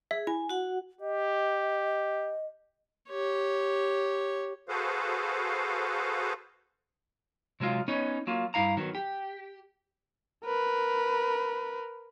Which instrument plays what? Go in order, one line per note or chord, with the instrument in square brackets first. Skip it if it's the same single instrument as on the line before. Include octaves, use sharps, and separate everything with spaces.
[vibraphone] G#4 [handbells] E5
[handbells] E4 [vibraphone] G#5
[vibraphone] F#4 F#5
[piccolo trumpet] G4 [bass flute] D#5
[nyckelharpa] G4 C#5
[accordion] F#4 G#4 A4 B4 C5 F5
[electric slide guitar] C3 F#3 G#3 F4
B3 C#4 D#4 C#5
F#3 A#3 F4
G2 C4 E4 F5 A#5
D#3 F#3 B3
G4
[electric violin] A#4 B4